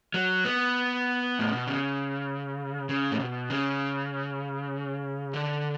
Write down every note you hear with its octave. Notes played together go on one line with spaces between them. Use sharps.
F#3
B3
A2
B2
C#3
C#3
A2
B2
C#3
D3